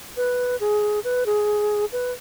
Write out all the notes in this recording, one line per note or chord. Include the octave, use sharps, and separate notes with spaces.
B4
G#4
B4
G#4
B4